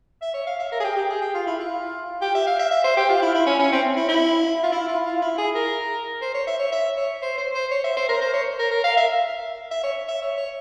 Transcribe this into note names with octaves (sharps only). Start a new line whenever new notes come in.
E5
C#5
F5
E5
A#4
G#4
G4
G4
G#4
G4
F4
E4
F4
G4
E5
F5
E5
E5
C5
G4
F4
E4
E4
C#4
C#4
C4
E4
E4
F4
E4
F4
F4
E4
G#4
A#4
C5
C#5
E5
C#5
E5
C#5
C5
C5
C5
C#5
E5
C5
A#4
C5
C#5
A#4
A#4
F5
E5
E5
C#5
E5
C#5
C#5